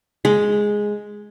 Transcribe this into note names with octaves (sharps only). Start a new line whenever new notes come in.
G#3